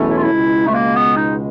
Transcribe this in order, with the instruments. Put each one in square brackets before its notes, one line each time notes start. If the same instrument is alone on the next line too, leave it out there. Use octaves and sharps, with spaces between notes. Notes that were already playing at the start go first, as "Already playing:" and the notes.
Already playing: [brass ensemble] E2 B2 F#3 A3 C#4
[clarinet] E4
F4
E4
[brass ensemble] C#2 B2 G#3
[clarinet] A3
A#3
B3
D#4